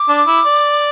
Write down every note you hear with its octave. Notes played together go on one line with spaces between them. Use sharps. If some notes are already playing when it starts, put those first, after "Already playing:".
Already playing: D6
D4
E4
D5